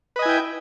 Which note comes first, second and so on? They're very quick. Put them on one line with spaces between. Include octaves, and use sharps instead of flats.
B4 D#5 G#5 E4 G5